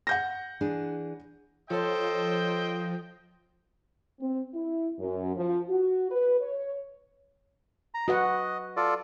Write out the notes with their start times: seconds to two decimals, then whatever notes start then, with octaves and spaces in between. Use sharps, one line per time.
0.07 F#5 G6 A#6
0.61 E3 D4 G#4
1.70 F3 A4 C5 C#5 D#5 G5 C6
4.20 C4
4.54 E4
4.99 F#2
5.37 F3
5.69 F#4
6.11 B4
6.41 C#5
7.94 A#5
8.08 F#4 B4 D#5 F#5
8.77 F4 A4 D5